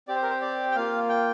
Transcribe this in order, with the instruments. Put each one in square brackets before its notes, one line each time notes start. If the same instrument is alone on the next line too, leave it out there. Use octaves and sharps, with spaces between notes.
[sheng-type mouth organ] C4 G4 D5
C5
A#4
C5
D5
G5
A#3 F4 F5
G5